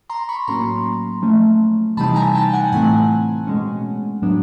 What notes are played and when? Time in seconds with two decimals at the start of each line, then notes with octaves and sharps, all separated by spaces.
0.10 A#5 C6
0.29 B5 C#6
0.47 A2 F#3 A#3 C#4 A#5 C6
1.22 F3 A3 C#4
1.97 C3 E3 G3 C4 D#4 A5 B5
2.16 G#5 A#5
2.35 G5 A5
2.53 F#5 G#5
2.72 A2 E3 A3 C4 F#5 G#5
3.47 B2 G#3 C#4
4.22 A2 F#3 B3 D4